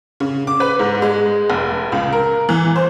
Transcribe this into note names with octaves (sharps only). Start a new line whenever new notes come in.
C#3
D6
B4
G#2
G#3
F1
C#2
A#4
E3
C5